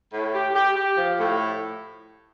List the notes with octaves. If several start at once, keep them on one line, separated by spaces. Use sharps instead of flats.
A2
G4
G4
G4
F3
A2